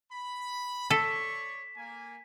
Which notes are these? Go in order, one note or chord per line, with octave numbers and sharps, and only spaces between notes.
B5
A4 C#5 D5 C#6 B6 E7
A#3 G#5